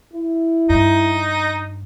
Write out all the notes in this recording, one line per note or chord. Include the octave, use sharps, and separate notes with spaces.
E4
G2 D#4